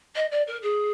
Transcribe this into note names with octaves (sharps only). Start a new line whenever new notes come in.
D#5
D5
A#4
G#4